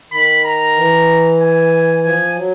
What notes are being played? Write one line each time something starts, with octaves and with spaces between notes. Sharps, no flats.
D#3 B5
A#5
E3
G#5
F3 G#5
F#3